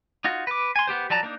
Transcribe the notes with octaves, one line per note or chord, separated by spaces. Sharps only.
D#4 F4 F#4
B4 D6
G#5 C6
B3 G4 C5
F3 F#3 D5 A5 A#5
A#3 D4 D#4